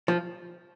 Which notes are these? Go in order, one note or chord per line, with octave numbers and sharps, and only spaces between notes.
F3